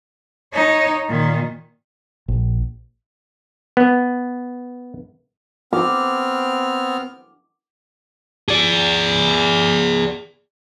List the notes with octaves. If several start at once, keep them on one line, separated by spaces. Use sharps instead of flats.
D#4 C#5
A#2 D#3
A#1
B3
B3 C4 D6 F6
G#4 D5